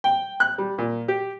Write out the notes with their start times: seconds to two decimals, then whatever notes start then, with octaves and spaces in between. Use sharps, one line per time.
0.04 G5
0.40 F#6
0.58 G3
0.78 A#2
1.08 G4